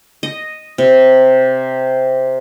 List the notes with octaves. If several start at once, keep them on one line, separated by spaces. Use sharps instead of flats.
D#5
C3